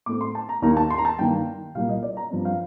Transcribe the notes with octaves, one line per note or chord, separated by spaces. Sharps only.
A2 A3 C4 D6
C6
A5
A#5
D#2 D#3 A#3 A#5
A5
C6
A#5
A5
G2 D#3 A#3 G5
C2 A#2 G3 A#3 F5
D#5
D5
A#5
G2 F3 C4
F5